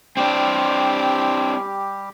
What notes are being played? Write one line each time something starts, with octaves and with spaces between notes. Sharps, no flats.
G3 C4 D4 G4 G5